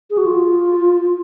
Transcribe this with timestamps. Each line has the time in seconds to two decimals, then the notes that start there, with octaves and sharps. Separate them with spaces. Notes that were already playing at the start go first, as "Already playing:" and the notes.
0.10 G#4
0.17 F#4
0.26 F4